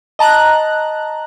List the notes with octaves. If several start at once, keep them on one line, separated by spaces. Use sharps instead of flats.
D#5 A5 A#5 F#6